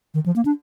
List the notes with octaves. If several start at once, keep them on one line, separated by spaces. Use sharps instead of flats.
D#3
F3
A#3
D4